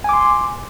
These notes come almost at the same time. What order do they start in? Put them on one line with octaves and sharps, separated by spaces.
G#5 D6 C6